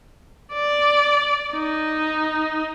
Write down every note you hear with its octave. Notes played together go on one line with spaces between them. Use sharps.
D5
D#4